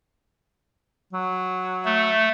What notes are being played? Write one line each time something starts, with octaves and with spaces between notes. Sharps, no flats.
F#3
A3